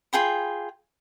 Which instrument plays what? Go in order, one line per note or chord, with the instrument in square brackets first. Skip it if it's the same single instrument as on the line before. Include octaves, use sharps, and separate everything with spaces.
[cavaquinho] F4 G#4 G5 B5